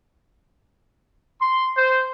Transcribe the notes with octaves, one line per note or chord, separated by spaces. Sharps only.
C6
C5